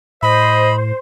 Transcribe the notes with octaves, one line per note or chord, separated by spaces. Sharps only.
A2 C5 D#5 B5